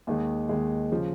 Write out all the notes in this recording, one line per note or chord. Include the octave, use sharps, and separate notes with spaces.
D#2 D#3 G#3
D#2 D#3 G#3
C#3 F3